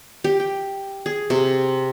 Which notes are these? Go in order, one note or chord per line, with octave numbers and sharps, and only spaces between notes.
G4
G5
G#4
C3